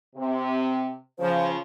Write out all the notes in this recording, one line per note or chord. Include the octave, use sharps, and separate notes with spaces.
C3
C#3 F3 C5